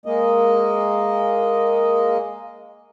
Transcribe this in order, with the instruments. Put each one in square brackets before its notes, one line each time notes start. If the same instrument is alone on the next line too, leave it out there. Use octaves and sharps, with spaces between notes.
[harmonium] G#3 A#3 D#5